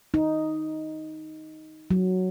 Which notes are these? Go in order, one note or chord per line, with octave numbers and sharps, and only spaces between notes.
D#4
F#3